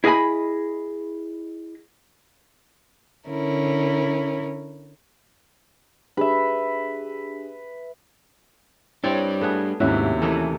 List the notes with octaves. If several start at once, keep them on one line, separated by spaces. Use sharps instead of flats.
E4 G#4 D#5 F5 G#5 B5
D3 C#4 E4 A#4
D4 G4 G#4 B4 E5
G3 C4 D4 E4 C#5 D5
A3 B3 G#4
D#2 G#2 C3 C#4 E4 F#4 E5
E3 A3 A#3 D#5